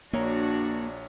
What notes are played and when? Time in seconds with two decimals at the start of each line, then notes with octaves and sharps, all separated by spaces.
0.13 A#1 A#3 D4 F#4 C#5 A#5